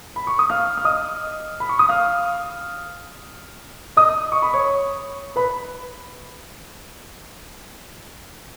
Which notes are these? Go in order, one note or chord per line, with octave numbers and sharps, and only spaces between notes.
B5
C#6
D#6
F5 F6
F6
D#5 D#6
B5
C#6
D#6
F5 F6
D#5 D#6
C#6
B5
C#5 C#6
B4 B5